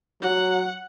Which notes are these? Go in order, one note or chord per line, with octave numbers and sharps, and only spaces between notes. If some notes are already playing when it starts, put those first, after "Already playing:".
F#3 F#5